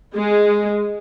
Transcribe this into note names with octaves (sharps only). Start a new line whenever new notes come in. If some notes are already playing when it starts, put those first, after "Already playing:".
G#3